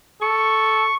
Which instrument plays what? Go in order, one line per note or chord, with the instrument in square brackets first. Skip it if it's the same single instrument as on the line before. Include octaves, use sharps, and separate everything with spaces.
[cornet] A4 [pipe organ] C#6